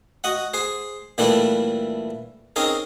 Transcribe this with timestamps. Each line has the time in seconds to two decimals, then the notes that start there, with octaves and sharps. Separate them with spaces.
0.24 F#4 D#5 F#5
0.54 G#4 C5
1.18 A#2 E3 G3 A3 D4 E4
2.56 C4 C#4 D#4 G#4 A#4